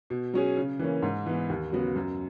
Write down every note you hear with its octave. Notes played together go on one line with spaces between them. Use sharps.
B2
F#3 C#4 G#4
C#3
E3 A#3 C#4
G#2
E3 B3
D#2
C#3 F#3 B3 F#4
F#2